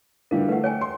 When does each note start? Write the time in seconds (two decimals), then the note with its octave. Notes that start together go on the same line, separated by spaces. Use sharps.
0.31 D3 E3 G3 A#4 F5
0.49 A3 B4 F#5
0.64 C#5 G5 G#5
0.81 C6